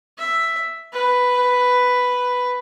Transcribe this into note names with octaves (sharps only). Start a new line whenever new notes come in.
E5
B4